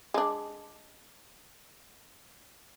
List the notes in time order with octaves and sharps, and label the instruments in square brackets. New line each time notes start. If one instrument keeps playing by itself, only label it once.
[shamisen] G#3 D4